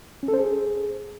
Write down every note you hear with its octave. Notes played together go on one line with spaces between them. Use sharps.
C#4
A4
C5
G#4